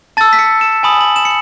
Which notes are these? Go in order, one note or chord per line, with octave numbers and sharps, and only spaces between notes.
A5 E6 A6
B6
C#7
E7
G#5 B5 D#6 F#7
F#7
E7
C#7